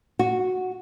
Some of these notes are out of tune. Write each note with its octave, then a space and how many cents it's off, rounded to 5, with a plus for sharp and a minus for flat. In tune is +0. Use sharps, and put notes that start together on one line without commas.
F#4 -5